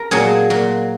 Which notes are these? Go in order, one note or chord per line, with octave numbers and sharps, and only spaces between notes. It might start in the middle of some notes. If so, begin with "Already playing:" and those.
Already playing: A#4
A#2 F#3 G#4
A#2 F#3